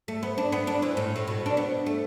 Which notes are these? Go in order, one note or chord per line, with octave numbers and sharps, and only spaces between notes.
A3
B3
D4
B3
D4
E3
A2
A2
B2
D4
B3
A3